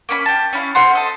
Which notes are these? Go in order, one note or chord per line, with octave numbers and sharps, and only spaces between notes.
A#3 C#4 B5
G4 A5
C#4 E4 F5
C5 F5 F#5 C6
A4 D#5 E5